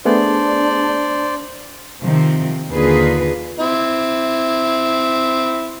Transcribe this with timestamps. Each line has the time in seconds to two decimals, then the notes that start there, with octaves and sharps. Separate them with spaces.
0.05 A3 B3 D4 G#4 C5 D5
2.02 C3 D#3 F3 C4
2.71 D#2 D3 F4 G#4 A#4 B4
3.59 C4 E4